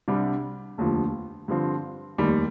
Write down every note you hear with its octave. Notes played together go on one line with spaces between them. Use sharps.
C2 C3 G3 D4
F1 D#2 D3 F3
G2 D3 F3 C4
F1 D#2 D#3 G3